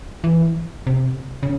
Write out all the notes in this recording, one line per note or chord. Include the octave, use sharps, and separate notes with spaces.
E3
C3
C#3